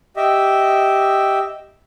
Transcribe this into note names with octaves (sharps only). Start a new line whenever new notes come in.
G4 D#5 E5